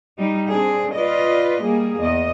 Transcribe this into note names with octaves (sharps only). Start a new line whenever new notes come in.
G3 D#4
C4 D4 G#4
F4 B4 D5 D#5
G3 A#3 G#4
E2 D#5